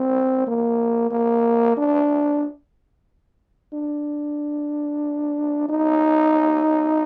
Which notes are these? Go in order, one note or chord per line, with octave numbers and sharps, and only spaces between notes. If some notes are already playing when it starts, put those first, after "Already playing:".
Already playing: C4
A#3
A#3
D4
D4
D#4